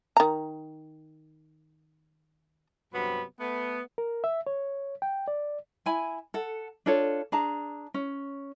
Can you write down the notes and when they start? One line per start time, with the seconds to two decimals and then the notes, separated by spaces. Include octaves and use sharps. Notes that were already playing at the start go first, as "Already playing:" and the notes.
0.17 D#3 A#5
2.93 G2 C3 F#3 B3 B5
3.40 A3 B3
3.98 A#4
4.24 E5
4.47 C#5
5.02 G5
5.28 D5
5.86 E4 G#5 B5
6.34 A4 F#5
6.86 D4 F4 A4 C#5
7.32 D4 G#4 A5 A#5
7.94 C#4